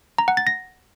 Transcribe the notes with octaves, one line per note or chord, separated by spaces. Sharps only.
A#5
F#5
A6
A#6